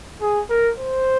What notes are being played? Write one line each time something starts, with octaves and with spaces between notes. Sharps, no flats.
G#4
A#4
C5